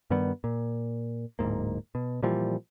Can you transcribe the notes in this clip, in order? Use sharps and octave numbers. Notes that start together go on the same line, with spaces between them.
G2 D#3 G3 B3
A#2
D1 F2 G#2 A#3
B2
A#2 E3 F3 G3